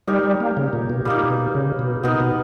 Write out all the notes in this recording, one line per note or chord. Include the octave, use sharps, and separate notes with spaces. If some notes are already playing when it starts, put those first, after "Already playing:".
G3 D#4 G4 A#4 C#5
G3
A#3
C#3
A#2
B2
A#2 G3 A#3 D#4
B2
C#3
B2
B2 B3 D#4 A#4
B2